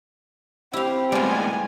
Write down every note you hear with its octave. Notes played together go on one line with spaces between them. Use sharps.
C4 E4 G4 F5
A2 G3 G#3 B3 F4 G#5